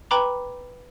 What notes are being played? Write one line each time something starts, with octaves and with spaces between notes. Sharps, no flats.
B4 G5 A#5 B5 D6 F7